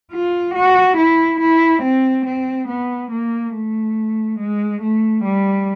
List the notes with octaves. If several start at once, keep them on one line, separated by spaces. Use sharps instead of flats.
F4
F#4
E4
E4
C4
C4
B3
A#3
A3
G#3
A3
G3